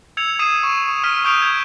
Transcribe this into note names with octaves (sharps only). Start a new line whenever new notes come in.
E6 G#6 C#7 F7
D#6 G#6 C7 D#7 E7
C#6
C#6 F6 B6 D#7
C#6 D#6 G6 D7 F7
G#6